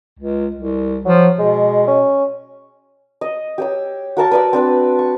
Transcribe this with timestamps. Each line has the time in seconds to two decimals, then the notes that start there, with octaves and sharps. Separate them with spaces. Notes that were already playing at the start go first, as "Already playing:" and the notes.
0.19 C#2
0.56 C2
1.05 F3 F#3
1.39 B2 G#3
1.88 C#4
3.21 D#5
3.58 G4 C#5 E6
4.17 F#4 A#4 A5 C#6
4.31 B4 D5 E6
4.53 C4 D4 B4
4.99 C#6